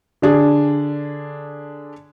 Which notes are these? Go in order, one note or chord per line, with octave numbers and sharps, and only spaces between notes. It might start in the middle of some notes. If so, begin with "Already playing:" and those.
D3 D4 G#4